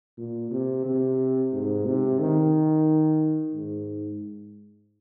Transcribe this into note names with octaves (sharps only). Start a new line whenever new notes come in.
A#2
C3
C3
G#2
C3
D#3
G#2